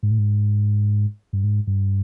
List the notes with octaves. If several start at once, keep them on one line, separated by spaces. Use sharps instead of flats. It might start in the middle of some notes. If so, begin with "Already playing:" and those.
G#2
A2
G#2
G2
G#2
G2